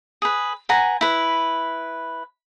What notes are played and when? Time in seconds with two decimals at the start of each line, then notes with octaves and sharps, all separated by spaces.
0.22 G#4 B4
0.69 B4 F#5 G#5 A#5
1.01 E4 B4